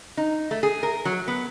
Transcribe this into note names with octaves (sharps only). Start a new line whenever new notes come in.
D#4
A3
G#4
A#4
F#3
B3